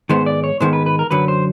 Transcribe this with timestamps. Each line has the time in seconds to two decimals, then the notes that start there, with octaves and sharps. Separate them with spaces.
0.09 G#2 D#3 G#3 B3 C5
0.26 D5
0.44 C#5
0.60 G#2 D#3 G#3 B3 C5
0.73 B4
0.86 B4
0.99 A#4
1.11 F#2 D3 F#3 B4
1.28 C5